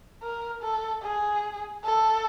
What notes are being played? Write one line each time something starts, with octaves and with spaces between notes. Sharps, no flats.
A#4
A4
G#4
A4